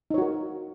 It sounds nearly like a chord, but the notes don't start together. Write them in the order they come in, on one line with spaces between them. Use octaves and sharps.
D#4 C#5 F#4 A#4